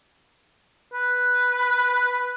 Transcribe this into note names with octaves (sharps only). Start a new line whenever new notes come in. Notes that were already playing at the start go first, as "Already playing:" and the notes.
B4